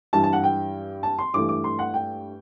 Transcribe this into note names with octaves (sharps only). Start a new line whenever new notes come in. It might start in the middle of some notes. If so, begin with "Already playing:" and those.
G2 E3 G3 A5
A5
F#5
G5
A5
C6
G2 E3 A3 D6
D6
C6
F#5
G5